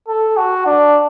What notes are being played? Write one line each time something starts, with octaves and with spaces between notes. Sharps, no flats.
A4
F#4
D4